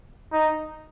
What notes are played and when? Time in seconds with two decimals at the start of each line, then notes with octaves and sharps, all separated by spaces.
0.33 D#4